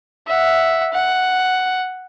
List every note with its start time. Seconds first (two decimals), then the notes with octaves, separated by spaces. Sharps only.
0.27 E5 F#5
0.93 F#5